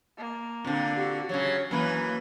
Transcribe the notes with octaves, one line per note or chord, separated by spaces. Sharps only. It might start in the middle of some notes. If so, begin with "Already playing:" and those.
A#3
A#2 D3 C4
F#4 G4
C#3 F#3 C#5
F#2 E3 A#3 B4